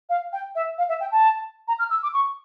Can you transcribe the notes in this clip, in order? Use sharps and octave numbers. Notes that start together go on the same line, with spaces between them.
F5
G5
E5
F5
E5
G5
A5
A#5
F6
E6
D6
C#6